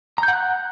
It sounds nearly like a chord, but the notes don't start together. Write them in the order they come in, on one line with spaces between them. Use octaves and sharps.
A#5 G6 F#5 F#6